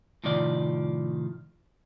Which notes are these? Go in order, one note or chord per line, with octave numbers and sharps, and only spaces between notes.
A2 C3 D#3 F3 D5